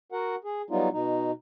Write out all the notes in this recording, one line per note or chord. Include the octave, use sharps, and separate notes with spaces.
F#4 A#4 F#5
G#4
F#3 G3 B3 D#4 F4
B2 D#4